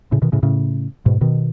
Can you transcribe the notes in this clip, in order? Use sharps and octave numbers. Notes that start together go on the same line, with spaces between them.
A2 C#3
B2 D#3
A2 C#3
A2 C#3
G#2 B2
B2 D#3